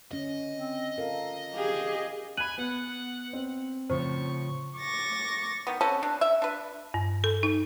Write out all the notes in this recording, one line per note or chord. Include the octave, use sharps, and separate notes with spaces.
D3 C#4 D#5
C4
F4 A4 A#4 F5
G4 G#4 F5
G#5 B5 F#6 D#7 F#7
B3 F#5
C4
A2 C#3 F3 C5 C#6
C#6 D6 A6 A#6
D#3 B3
C4 C#4 A4 B4
D4
E5
D4 B4
G2
A4
D#4